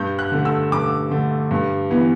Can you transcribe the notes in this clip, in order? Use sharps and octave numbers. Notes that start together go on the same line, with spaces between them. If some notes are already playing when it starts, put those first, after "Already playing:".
Already playing: G2 G6
F#6
D3 A3
E6
G2 D6
D3 A3
G2
E3 B3